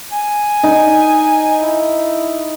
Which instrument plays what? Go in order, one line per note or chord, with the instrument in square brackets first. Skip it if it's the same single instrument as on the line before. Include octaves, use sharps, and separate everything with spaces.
[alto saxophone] G#5
[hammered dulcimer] D#4
[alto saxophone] E4